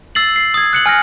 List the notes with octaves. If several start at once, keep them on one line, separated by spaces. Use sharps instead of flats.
E6 A6 C7 F#7
C7
D#6 G#6
F#6 C#7 F#7
G#5 F6 F#6 A#6